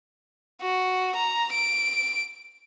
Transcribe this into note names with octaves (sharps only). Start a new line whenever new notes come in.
F#4
A#5
D7